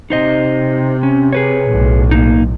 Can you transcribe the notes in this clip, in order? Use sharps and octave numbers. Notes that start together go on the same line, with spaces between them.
C3 D#4 C5 D#5
C#4
G#4 B4 C#5
B1 A2
A#3 D#4